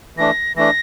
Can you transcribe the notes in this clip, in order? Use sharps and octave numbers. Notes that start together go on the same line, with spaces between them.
E3 A3 D4 A#6
E3 A3 D4 A#6